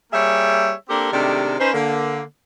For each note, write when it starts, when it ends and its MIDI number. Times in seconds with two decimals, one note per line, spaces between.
0.13 0.72 55
0.13 0.72 58
0.13 0.72 68
0.13 0.72 73
0.13 0.72 76
0.89 1.09 58
0.89 1.09 60
0.89 1.09 62
0.89 1.09 67
0.89 1.09 69
0.89 1.09 70
1.12 1.55 48
1.12 1.55 51
1.12 1.55 56
1.12 1.55 57
1.12 1.55 62
1.12 1.55 67
1.60 1.71 61
1.60 1.71 63
1.60 1.71 71
1.60 1.71 72
1.73 2.21 50
1.73 2.21 58